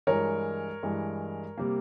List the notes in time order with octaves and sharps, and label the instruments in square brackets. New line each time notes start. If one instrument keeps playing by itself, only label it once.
[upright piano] G2 E3 G#3 A#4 C#5
G2 E3 G#3
C3 G3 A#3